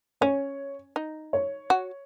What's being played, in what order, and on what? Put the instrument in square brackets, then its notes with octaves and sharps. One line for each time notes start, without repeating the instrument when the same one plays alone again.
[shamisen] C#4 [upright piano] C#5
[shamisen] D#4
[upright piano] C#5
[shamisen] F#4